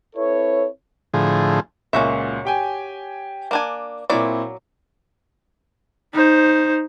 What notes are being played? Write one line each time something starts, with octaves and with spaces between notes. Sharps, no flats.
C4 E4 A4 B4 C#5
A2 D3 F3 G#4
C#2 A#2 C#4 F#4 E5
G4 G5 G#5
A#3 D4 G#5
A#2 F#3 C4 E4 D5
D#4 C5